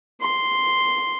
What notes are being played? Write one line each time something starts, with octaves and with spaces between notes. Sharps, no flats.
C6